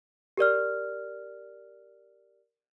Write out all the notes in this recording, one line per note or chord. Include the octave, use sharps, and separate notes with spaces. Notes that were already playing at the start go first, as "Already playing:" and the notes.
G4 A#4 D5 F6